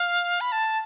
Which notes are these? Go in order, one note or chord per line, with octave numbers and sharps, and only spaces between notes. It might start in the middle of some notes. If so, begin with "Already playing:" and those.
Already playing: F5
B5
A5